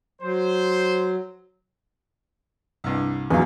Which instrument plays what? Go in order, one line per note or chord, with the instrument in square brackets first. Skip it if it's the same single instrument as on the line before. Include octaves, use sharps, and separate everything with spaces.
[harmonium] F#3 [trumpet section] C5
[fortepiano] C2 G2
[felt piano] E2 F#3 [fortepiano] C#4 F5